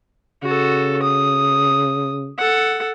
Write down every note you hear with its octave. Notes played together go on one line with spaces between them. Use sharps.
C#3 F#4 A4
D#6
A4 F#5